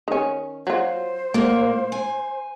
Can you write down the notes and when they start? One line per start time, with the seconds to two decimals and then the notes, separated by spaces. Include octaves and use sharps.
0.08 D#3 C#4
0.67 F#3 F4 C5
1.34 A#2 F#3 A#3
1.92 G#5